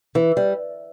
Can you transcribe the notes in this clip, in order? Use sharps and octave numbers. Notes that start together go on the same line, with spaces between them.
E3
G3